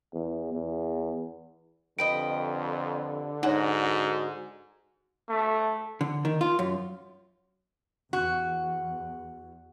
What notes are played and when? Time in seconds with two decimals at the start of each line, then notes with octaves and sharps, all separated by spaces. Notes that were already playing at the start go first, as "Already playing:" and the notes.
0.13 E2
0.53 E2
1.99 F2 D3 G4 B4 D#5 D7
3.43 G#2 D#4 F#4 C#5
5.29 A3
6.01 D3
6.25 D#3
6.41 F4
6.59 F#2
8.13 E2 F#4